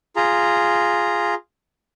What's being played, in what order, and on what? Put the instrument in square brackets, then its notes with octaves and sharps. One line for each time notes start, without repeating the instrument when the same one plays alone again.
[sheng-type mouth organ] F4 G#4 A#5